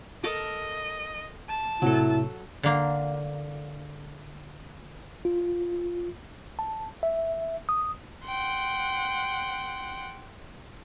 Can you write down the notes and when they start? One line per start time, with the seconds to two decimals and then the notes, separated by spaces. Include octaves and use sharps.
0.24 A4 A#4 D#5 A5
1.49 A5
1.82 A2 C3 F#3 E4 A4
2.63 D3 A#3
5.25 F4
6.59 A5
7.03 E5
7.69 D#6
8.24 F#5 G5 C6